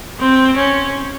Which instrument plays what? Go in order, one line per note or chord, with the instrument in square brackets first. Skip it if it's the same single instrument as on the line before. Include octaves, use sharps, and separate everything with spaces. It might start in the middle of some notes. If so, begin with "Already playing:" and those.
[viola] C4
C#4